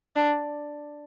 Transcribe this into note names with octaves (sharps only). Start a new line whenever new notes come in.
D4